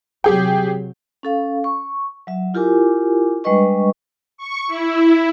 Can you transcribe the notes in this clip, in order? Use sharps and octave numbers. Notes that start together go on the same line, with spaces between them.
C3 F#3 G4 G#4 G5
C#4 A4 F5
C#6
F#3 E5
E4 F4 G4 A#4 G#5 D6
G3 G#3 D4 B4 D#5 C#6
C#6
E4